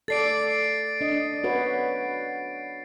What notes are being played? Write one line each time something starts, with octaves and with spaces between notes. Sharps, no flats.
A4 D5 A6 C7 D7
D4 D#5
F#4 B4 C#5